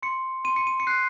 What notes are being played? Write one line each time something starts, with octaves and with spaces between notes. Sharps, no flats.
C6 C#7
C6 D#7
C#7
D#7
C#7
F#6 C7